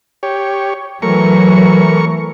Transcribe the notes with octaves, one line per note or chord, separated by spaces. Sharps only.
G4 C#5
E3 F#3 A3 A#4 C#6